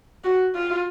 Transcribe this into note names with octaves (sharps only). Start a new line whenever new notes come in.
F#4
F4